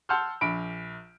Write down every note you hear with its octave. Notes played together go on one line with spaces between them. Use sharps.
F#5 A5 C6 E6 F6 G6
A#1 B5 D7